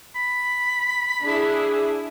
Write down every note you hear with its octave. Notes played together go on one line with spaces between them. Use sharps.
B5
D4 E4 G#4